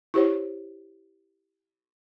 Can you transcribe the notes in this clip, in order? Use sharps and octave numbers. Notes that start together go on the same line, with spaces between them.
E4 G4 C5 C#5